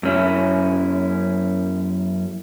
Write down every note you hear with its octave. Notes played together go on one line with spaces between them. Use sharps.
F#2 C#4 E4